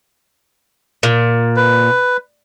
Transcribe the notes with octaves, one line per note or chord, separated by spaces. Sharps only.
A#2
B4